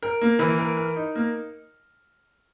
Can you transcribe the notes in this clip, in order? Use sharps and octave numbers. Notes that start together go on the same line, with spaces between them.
A#4
A#3
E3
A#4
A#4
D#4
A#3